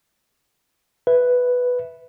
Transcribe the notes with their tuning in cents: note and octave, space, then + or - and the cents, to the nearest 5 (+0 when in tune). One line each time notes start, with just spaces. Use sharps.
B4 +0 E5 -5